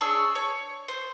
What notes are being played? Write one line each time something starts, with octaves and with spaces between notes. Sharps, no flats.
D4 G#4 C#5 E6
C#5
C5